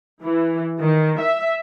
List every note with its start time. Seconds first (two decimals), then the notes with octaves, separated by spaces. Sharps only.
0.22 E3
0.81 D#3
1.21 E5